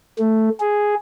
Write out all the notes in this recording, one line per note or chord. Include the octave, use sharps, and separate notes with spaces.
A3
G#4